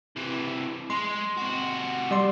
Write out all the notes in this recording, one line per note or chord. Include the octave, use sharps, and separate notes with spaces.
C3 E3
G#3 C6
C3 F#4
G3 D5 C6